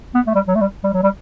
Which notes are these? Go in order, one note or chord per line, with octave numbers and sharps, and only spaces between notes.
B3
A3
G3
F#3
A3
G3
G3
F#3
G3